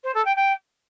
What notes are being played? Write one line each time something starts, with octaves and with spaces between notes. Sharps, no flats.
C5
A4
G5
G5